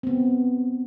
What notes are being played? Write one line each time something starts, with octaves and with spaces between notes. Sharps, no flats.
B3 C4